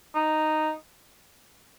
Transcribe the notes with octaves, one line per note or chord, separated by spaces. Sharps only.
D#4